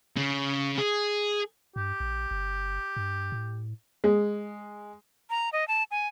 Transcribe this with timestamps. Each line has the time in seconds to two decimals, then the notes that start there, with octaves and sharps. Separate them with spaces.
0.16 C#3
0.78 G#4
1.76 G2 G4
2.00 A#1
2.31 G1
2.97 G2
3.32 A2
4.04 G#3
5.30 A#5
5.53 D#5
5.68 A5
5.91 G#5